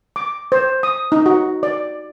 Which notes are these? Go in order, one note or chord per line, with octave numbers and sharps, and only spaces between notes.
D6
C5
D#6
D#4
F#4
D5